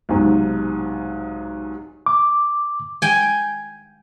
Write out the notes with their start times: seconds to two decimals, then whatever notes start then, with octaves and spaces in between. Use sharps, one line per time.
0.09 B1 G#2 C3
2.06 D6
3.02 G5 G#5